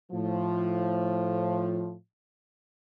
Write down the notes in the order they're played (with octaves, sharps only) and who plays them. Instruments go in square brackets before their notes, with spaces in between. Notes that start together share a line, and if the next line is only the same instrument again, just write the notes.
[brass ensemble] A2 F3